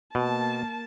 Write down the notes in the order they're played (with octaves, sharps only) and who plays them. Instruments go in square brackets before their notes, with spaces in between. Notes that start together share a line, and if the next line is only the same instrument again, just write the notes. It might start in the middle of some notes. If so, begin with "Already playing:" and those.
[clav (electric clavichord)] B2 [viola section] A#3 A5